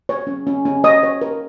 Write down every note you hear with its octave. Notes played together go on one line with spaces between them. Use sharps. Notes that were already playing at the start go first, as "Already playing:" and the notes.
C#5
C#4
C#4
C#4
C#5 D#5 D#6
C#5
A#4